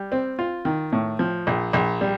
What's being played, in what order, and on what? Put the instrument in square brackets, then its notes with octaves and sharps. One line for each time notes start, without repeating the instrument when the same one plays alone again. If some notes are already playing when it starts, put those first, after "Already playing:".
Already playing: [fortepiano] G3
C4
F4
D#3
A2
F3
A#1
A#1
G3